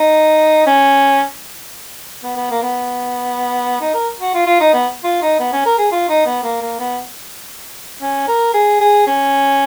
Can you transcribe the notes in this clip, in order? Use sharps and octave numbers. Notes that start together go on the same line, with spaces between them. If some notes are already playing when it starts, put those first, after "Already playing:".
Already playing: D#4
C#4
B3
B3
A#3
B3
D#4
A#4
F#4
F4
F4
D#4
B3
F4
D#4
B3
C#4
A#4
G#4
F4
D#4
B3
A#3
A#3
B3
C#4
A#4
G#4
G#4
C#4